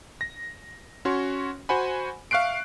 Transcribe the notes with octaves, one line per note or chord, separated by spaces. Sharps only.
A#6
C#4 F#4 C#5 C6
F#4 C5 F#5 G#5 B5
E5 F5 C#6 F#6 C7 D7